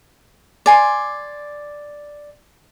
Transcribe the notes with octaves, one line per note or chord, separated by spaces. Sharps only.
D5 G#5 C6